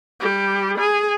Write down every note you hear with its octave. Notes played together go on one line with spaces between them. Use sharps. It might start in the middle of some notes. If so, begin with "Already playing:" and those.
G3 G4
G#4 G#5